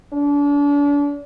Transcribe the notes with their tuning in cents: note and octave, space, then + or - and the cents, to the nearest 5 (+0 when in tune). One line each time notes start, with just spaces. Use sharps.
D4 -35